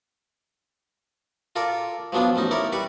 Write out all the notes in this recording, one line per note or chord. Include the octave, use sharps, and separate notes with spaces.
F4 A4 A#4 D5
F3 F#3 B3 D4 F4
A1 C#4 D#4
E4 A#4 C#5 D5 A#5
G3 B4 D5 C#6